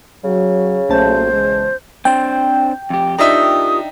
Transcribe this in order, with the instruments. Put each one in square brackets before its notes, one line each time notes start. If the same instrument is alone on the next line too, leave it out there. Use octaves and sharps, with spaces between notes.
[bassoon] C#3 [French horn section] F#3
[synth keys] B1 C#4 A5 [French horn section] A#2 F#3 A3 [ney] C5
[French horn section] E2 C#3 G#3
[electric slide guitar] C4 D4 C5 [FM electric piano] G5
[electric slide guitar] F2 G4
[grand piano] D4 D#4 E5 [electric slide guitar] F4 G4 A#4 [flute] D#6